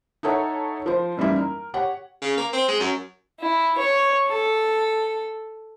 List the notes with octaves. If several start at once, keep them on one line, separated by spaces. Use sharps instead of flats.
D#4 E4 A4 C#5 F#5
F3 C5
F#2 E3 G3 A#3 D#4 E4
A#4
G4 C#5 F#5
C#3
A#3
C4
G#3
F#2
E4
C#5
A4